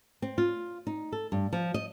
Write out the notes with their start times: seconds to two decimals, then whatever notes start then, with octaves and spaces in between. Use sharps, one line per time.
0.22 C4
0.38 F4
0.87 D#4
1.12 A4
1.32 G2
1.53 F3
1.74 D#5